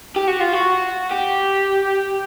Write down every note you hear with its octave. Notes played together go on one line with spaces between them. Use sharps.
G4
F#4
F4
F#4
G4